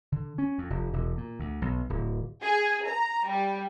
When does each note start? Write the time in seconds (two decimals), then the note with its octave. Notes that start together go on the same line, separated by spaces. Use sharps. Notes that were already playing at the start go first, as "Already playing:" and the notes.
0.12 D3
0.38 C#4
0.58 F2
0.70 F1
0.93 E1
1.17 A#2
1.39 D2
1.62 B1
1.90 D1
2.43 G#4
2.88 A#5
3.28 G3